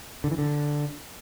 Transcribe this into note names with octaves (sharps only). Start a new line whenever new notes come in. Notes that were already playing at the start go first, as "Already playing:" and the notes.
D3
E3
D3